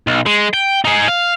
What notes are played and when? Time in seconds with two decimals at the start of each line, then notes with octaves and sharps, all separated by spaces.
0.07 B1
0.26 G#3
0.54 G5
0.85 D#4 G#4
1.08 F5